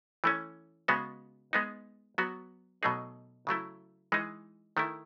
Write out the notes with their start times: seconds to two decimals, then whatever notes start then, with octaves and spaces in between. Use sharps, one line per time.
0.24 E3 A3 C#4
0.88 C#3 G#3 B3 F#4
1.53 G#3 B3 D#4
2.18 F#3 B3 F#4
2.83 B2 F#3 A3 D#4 G#4
3.47 C#3 F#3 A3 E4
4.12 E3 G#3 D#4
4.77 D#3 A3 E4